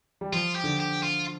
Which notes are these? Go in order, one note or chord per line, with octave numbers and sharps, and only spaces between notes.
G3
F3 F4
G4
D3
G4
F4